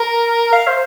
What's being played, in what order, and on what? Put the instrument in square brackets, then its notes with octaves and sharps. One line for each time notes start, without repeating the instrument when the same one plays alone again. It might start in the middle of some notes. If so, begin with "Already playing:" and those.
Already playing: [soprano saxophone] A#4
F5
C5